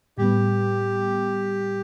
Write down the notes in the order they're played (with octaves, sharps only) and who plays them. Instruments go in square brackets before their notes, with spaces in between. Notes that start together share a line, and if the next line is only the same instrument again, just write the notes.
[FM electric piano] A2 G3 B3 [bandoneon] G4